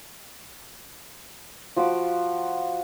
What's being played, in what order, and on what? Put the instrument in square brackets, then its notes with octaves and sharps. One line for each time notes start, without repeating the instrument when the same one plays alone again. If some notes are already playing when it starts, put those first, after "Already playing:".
[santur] F3 F#4 B5 D6